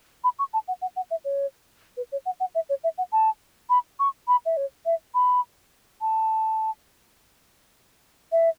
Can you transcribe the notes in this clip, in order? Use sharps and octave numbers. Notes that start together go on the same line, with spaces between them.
B5
C#6
A5
F#5
F#5
F#5
E5
C#5
B4
C#5
F#5
F#5
E5
C#5
E5
F#5
A5
B5
C#6
B5
E5
C#5
E5
B5
A5
E5